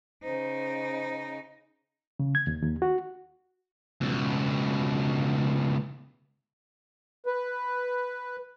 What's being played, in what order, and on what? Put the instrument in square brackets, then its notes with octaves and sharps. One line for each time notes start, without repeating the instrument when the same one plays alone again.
[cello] C#3 D#4 [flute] C5
[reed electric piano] C#3
G#6
D#2
D#2
F#4
[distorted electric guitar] C#2 B2
[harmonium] B4